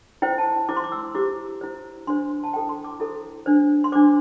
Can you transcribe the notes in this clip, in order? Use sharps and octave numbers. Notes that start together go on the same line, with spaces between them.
E4 C5 G5
A5
E4 C5 D6
C6
D6
E6
E4 G4 C5 D6
E4 C5
D4 C5 C6
A5
E4 A4 C5 G5
C6
D6
E4 A4 C5
D4 C5
C6
D4 C5 D6